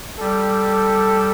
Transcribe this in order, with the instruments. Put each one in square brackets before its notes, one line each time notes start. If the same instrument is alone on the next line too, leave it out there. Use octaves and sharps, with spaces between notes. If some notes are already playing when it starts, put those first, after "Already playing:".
[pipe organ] G3 [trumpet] A4